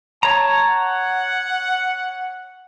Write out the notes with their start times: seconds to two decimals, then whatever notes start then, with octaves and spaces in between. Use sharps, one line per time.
0.23 C#5 A5 A#5
0.68 F#5